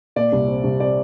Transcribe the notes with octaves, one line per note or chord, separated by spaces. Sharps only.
A#2 D5
C2
C4
C2
C4 D5